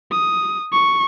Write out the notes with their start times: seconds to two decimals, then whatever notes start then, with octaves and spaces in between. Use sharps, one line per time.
0.11 D#6
0.73 C#6